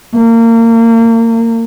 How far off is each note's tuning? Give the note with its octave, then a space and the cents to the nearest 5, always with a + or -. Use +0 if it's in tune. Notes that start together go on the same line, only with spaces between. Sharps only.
A#3 -30